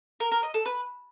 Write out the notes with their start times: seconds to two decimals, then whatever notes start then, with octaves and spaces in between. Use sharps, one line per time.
0.20 A#4
0.32 A#4
0.43 D#5
0.54 A4
0.66 B4